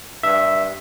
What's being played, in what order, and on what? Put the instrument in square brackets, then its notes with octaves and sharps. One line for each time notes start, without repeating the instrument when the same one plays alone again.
[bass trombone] G2 [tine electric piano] E5